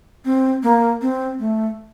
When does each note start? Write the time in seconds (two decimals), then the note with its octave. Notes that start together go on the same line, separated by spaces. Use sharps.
0.25 C4
0.63 A#3
1.02 C4
1.39 A3